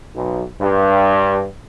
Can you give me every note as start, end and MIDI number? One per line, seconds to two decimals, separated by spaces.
0.15 0.44 35
0.62 1.47 43